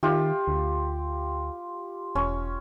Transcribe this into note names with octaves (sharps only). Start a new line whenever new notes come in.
D#3 F4 G4
D2
E1 C#4